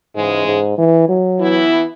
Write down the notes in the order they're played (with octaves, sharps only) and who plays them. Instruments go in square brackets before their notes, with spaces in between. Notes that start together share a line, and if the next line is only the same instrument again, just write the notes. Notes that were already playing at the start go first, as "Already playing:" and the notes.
[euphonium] G#2 [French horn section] C#3 E3 G#3
[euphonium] G#2
E3
F#3
[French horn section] E3 B3 E4